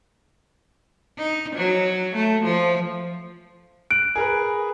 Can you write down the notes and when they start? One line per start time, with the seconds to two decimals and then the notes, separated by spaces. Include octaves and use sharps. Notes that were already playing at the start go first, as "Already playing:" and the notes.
1.18 D#4
1.56 F#3
2.16 A3
2.44 F3
3.91 F#6 D7
4.16 G#4 A#4 B4